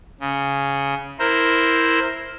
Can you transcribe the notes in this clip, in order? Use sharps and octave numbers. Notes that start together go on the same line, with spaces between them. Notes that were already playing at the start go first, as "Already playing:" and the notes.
C#3
E4 A#4 C5